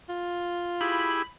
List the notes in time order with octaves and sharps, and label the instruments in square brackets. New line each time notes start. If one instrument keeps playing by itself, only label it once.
[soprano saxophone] F4
[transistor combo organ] E4 G4 G#4 [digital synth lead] B5